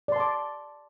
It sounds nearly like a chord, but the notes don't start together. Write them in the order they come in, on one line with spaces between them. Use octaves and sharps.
D5 C6 A5 D6